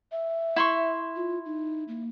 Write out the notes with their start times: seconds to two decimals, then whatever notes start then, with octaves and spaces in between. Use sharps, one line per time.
0.12 E5
0.56 E4 C6 C#6
1.16 F4
1.45 D#4
1.88 A#3